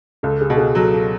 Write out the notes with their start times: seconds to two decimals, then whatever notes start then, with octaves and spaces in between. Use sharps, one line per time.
0.23 C#2 A4
0.41 G#4
0.50 B2 A4
0.58 G#4
0.75 F#3 A4
0.93 A4